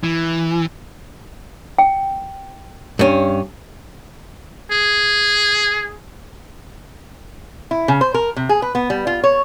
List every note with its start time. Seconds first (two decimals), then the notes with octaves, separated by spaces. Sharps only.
0.03 E3
1.79 G5
2.99 G2 C#4
4.71 G#4
7.71 E4
7.88 C#3
8.01 C5
8.14 A#4
8.36 C3
8.49 G#4
8.62 B4
8.75 B3
8.90 G3
9.07 F4
9.24 C#5